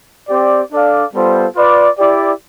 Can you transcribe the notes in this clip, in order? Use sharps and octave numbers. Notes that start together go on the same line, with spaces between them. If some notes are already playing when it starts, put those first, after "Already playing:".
C4 G4 D5
D4 A4 D5 F5
G3 B3 F4 A4 C5
F4 B4 D5
E4 G4 D5